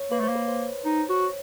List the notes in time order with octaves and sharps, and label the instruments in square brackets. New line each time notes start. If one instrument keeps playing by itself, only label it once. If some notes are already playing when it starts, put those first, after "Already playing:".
Already playing: [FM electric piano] C#5
[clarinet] A#3 [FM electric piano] B4
[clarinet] A3
[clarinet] A#3 [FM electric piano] C5
[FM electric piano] B4
C5
[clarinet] D#4
F#4